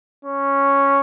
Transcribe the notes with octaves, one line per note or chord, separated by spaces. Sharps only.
C#4